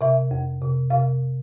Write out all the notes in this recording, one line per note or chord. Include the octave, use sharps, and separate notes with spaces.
C3 E5
F2
C3
C3 F5